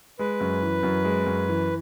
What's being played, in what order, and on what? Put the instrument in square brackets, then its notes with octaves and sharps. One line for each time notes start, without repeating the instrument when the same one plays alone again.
[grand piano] G#3 [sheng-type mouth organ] B4
[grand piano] F#2
E3
F#2
G#3
F#2
E3